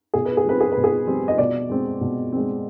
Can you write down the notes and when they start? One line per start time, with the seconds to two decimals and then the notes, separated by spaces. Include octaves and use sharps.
0.14 B2 G#4
0.25 B4
0.37 G#4
0.45 G3 C4 B4
0.61 G#4
0.72 B4
0.77 B2
0.84 G#4
1.07 G3 C4
1.28 D#5
1.38 B2 D5
1.69 G#3 C4
2.01 B2
2.32 G#3 C4